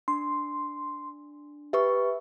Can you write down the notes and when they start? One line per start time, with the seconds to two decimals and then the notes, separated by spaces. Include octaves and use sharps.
0.08 D4 C6
1.73 G4 B4 E5 C#6